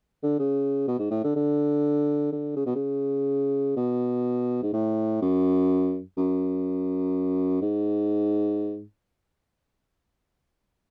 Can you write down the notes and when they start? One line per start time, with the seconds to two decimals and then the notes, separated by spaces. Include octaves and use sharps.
0.23 D3
0.39 C#3
0.87 B2
0.99 G#2
1.11 A2
1.24 D3
1.36 D3
2.32 D3
2.56 C#3
2.66 B2
2.75 C#3
3.76 B2
4.63 G#2
4.73 A2
5.22 F#2
6.17 F#2
7.62 G#2